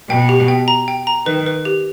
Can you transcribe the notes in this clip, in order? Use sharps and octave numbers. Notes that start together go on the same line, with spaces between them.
B2 G5
G4
G5
A#5
G5
A#5
D#3 B4
B4
G4